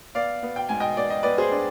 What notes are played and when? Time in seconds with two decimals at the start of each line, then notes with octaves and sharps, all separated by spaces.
0.15 B3 D5 F5
0.43 B3
0.56 G5
0.69 G#2 G#5
0.80 D#5 G5
0.97 B3 D5
1.10 D#5
1.23 B3 B4 D5
1.38 G#4 C5
1.51 D4